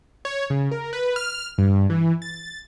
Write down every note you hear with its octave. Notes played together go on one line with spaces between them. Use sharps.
C#5
C#3
A#4
B4
F6
G2
E3
A6